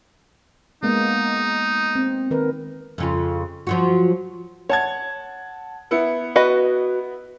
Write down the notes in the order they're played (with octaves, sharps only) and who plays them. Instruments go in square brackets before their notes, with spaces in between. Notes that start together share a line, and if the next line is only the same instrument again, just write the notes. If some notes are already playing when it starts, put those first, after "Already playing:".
[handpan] G#3 A#3 B3 [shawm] D#4
[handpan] C4
D#3 A#4 B4
[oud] F2 C#3 F4
F3 F#3 F#4
[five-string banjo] C#5 [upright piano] F#5 A5 G#6
[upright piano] B3 E4 C#7
[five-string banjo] F#4 B4 D#5